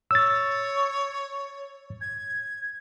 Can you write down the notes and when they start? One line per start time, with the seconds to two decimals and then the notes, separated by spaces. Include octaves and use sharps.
0.11 C#5 E6 A6
2.00 G#6